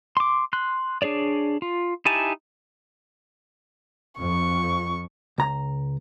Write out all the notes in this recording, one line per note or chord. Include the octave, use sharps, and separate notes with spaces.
C6 D6
C6 F#6
D4 G#4 C#5 D5
F4
D#4 E4 G4 G#5 A5
F2 C#6
C#2 A#5